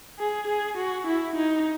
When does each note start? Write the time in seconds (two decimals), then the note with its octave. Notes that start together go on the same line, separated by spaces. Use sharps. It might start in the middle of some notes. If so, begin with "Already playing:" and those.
0.19 G#4
0.48 G#4
0.77 F#4
1.07 E4
1.36 D#4